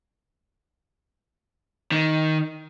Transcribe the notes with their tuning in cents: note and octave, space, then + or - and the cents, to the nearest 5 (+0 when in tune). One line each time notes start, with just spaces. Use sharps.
D#3 +10